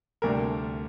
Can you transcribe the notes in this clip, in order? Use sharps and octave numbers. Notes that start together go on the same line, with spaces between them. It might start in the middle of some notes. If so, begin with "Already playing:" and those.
D2 C3 G3 D4 A#4